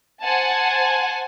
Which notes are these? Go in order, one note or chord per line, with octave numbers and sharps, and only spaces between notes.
C5 F#5 G#5 A5